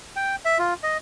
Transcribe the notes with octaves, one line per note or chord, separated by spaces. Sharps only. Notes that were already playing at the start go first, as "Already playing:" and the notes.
G5
E5
F4
D#5